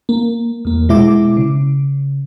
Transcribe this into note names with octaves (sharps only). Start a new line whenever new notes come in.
A#3
E2 A#3
B2 G#3 E4 E5 D6
C#3